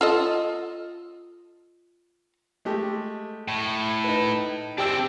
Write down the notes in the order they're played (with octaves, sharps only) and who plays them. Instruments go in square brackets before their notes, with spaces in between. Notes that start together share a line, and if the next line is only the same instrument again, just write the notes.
[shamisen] F4 A4 D#5
[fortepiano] G#3 A3 G4
[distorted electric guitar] A2
[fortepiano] D#4 B4
[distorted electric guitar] C4 D4 [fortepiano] G4 G5 E6